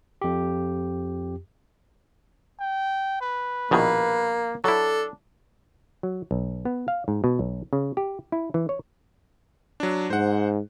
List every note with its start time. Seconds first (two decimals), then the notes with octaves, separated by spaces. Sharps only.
0.22 F2 G4
2.60 G5
3.21 B4
3.71 A#1 B2 D#3 A#3
4.64 F#3 D4 E4 A4
6.03 F#3
6.31 B1
6.65 B3
6.88 F5
7.08 G#2
7.24 B2
7.39 B1
7.73 C#3
7.97 G4
8.32 E4
8.54 E3
8.69 C#5
9.80 F#3 D4
10.10 G#2 C5 F#5